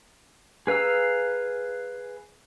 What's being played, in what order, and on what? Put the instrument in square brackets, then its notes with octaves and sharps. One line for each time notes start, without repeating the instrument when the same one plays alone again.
[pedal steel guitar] G#4 B4 F5 A#5 E6